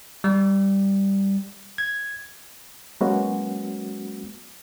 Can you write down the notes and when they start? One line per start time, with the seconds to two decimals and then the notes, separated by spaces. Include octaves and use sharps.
0.24 G3
1.78 G#6
3.01 F#3 G#3 A#3 B3 C#4 F#4